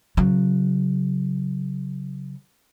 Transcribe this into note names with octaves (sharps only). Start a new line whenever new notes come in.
C#3 F#3